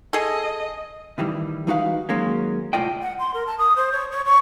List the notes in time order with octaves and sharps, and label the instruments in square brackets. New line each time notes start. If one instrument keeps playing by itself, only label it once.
[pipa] G#4 A4 [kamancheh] D#5
[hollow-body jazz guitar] A2 D#3 E3 G3
E3 G#3 D#4 F#4 B4 F5
D#3 F#3 G#3 A#3 C#4
C2 A2 F4 D5 D#5 G5
[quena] F#5
C6
A#4
A5
D#6
C5
C#5
C#5
C#6